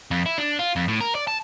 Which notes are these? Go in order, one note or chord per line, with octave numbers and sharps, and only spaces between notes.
F2
E4
D4
F4
F2
A2
A#4
D5
A5